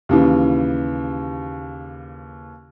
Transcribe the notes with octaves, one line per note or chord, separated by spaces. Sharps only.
D#2 C#3 E3